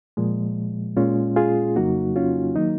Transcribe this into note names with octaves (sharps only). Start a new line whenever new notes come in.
A#2 F3 G#3
A#2 G#3 C#4 F4
F4 G#4
F2 C#3 F#3 A#3 D#4 F#4
C#4 F4
D#3 F#3 A#3 D#4